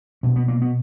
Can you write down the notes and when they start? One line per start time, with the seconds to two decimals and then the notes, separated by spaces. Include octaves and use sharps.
0.23 B2 C#4
0.36 B3
0.48 A#3
0.62 B3